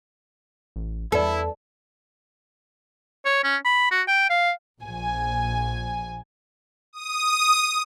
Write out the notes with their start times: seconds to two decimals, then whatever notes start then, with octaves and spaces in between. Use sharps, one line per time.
0.76 A1
1.12 E2 E4 A4 B4 D5
3.25 C#5
3.44 C#4
3.65 B5
3.91 F#4
4.08 G5
4.30 F5
4.80 A#1 G#5
6.93 D#6